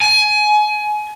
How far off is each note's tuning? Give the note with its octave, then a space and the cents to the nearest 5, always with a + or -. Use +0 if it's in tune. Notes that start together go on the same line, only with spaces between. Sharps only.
G#5 +25